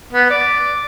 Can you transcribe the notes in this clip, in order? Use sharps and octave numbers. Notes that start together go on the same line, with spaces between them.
B3
D5